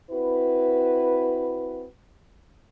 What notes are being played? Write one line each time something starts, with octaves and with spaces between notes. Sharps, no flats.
C4 E4 F#4 B4